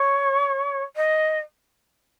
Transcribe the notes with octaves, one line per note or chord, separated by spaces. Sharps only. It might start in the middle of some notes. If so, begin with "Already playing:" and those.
Already playing: C#5
D#5